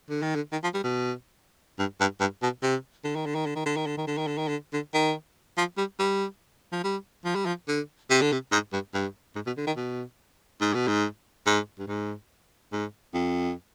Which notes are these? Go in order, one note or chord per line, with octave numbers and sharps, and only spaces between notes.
D3
D#3
D3
D#3
F3
G3
B2
G2
G2
G2
B2
C3
D3
D#3
D3
D#3
D3
D#3
D3
D#3
D3
D#3
D3
D#3
D3
D#3
D3
D3
D#3
F3
G3
G3
F3
G3
F3
G3
F3
D3
C3
D3
C3
G#2
G2
G2
G#2
B2
D3
D#3
B2
G#2
B2
G#2
G#2
G2
G#2
G#2
F2